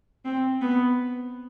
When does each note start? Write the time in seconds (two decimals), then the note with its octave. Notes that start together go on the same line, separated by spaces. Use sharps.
0.25 C4
0.61 B3